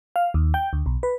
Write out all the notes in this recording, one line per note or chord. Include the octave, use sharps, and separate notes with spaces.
F5
D#2
G5
D2
B1
B4